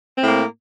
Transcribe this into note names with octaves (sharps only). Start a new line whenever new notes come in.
A2 A#3 C4